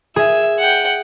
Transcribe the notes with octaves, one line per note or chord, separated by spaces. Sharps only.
G#4 E5
F#5 G5